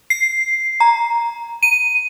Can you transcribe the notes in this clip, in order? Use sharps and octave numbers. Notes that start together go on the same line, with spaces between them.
C7
A#5
D#7